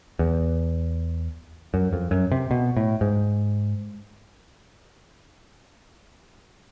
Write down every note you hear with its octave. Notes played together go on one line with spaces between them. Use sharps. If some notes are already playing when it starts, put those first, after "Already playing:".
E2
F#2
F2
F#2
C3
B2
A2
G#2